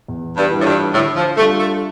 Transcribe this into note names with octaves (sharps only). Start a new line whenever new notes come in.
E2
G2
E3 G3 D4 F4
A2
G2
A2 D3
F3
G3 A3 D4 F4
A3